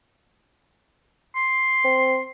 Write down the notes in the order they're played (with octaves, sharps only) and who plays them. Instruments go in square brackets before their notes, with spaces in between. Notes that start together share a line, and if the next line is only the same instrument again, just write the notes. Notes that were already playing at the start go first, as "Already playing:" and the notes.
[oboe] C6
[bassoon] C4